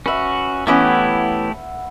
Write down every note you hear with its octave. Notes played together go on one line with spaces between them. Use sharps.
C#4 F#4 B4 E5
E3 A3 B3 C#4 E4 G4 E5 F#5